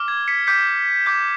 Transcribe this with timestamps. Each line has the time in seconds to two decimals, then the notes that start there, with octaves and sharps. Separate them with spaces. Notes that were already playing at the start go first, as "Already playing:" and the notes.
Already playing: D6 F6
0.08 G#6
0.28 B6 C#7
0.47 D6 G6 B6 C#7
1.06 D6 G6